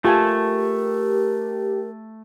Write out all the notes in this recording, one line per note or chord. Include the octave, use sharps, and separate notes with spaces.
A3 F4 G4 A#4 G#5 A5